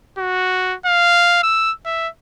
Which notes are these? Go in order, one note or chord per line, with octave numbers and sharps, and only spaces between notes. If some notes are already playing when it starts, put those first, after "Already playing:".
F#4
F5
E6
E5